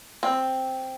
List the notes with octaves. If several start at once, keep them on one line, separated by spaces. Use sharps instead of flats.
C4